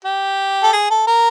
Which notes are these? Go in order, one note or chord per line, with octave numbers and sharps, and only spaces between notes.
G4
A4
G#4
A4
A#4